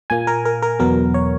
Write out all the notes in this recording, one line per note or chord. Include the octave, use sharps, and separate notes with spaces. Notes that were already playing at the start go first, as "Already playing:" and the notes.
A#2 A#3 G#5
A#4
A#4
A#4
E2 B2 F#3 B3 A#4
C#5